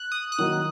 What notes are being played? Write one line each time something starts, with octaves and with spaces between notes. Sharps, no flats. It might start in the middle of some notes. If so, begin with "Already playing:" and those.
Already playing: F#6
D#6
F#6
D#3 F#3 A#3 D#4 D#6